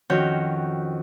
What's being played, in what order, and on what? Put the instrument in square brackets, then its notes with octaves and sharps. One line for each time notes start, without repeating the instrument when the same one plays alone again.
[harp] F2 D#3 C#4 F#4 C#5 G6